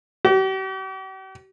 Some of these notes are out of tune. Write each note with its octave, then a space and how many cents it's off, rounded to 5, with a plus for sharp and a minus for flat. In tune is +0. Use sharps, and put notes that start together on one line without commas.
G4 -45